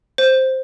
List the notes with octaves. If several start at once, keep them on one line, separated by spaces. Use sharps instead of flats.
C5